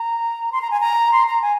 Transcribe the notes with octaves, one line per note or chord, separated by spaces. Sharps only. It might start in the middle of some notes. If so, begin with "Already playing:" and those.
Already playing: A#5
C6
A#5
G#5
A#5
C6
A#5
G#5